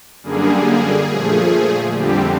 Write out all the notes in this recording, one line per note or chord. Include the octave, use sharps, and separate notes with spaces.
F#2 D3 G3 A#3 G#4
A#2 F3 A3
F2 D3 G3 C4 G4